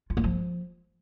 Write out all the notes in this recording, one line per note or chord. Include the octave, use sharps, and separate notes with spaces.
F4
A#3
F3